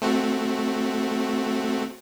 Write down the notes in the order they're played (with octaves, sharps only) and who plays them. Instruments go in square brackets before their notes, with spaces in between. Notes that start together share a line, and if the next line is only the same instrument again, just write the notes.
[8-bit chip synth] A3 C4 F#4